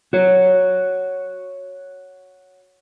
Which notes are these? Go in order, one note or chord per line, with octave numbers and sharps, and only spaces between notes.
F#4 C#5